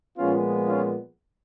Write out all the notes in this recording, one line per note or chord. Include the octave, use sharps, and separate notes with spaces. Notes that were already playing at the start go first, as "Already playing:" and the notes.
A#2 F3 G#3 B3 C#4 F4
C#4 F4